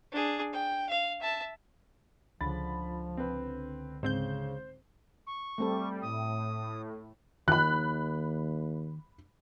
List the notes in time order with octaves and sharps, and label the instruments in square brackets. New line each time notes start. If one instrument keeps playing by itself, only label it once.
[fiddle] D4 G#4
G5
F5
E5 A5
[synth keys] C#2 D3 [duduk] F3 [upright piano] B5 A6
[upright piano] C4 B4
[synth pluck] G#2 C4 G6 [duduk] C#3 [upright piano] C5
[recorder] C#6
[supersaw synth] G3 [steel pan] A3 C4 A4
[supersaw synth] A2 [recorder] D#6
[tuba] D#2 [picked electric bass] D#3 [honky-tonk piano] B5 F#6